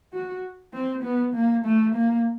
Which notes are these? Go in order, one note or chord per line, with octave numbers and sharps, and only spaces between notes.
F#4
C4
B3
A#3
A3
A#3